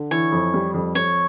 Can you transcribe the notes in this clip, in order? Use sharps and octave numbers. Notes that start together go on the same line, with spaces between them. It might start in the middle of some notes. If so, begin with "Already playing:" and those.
Already playing: D3
E3 C#5
F2
G3
F2
F2 C#5